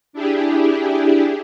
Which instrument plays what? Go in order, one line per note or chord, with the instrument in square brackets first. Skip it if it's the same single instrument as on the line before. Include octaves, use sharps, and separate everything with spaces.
[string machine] D4 E4 G4 G#4